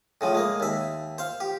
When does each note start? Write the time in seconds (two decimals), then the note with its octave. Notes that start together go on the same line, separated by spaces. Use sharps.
0.21 A2 C#3 F3
0.35 G#3 A#3
0.60 D#2 E5
1.18 C5 F5
1.40 G4